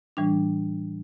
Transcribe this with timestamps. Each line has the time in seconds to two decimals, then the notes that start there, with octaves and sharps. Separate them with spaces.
0.17 A2 E3 G3 D4